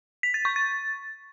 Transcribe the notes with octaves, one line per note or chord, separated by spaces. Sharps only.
B6
A6
C#6
A6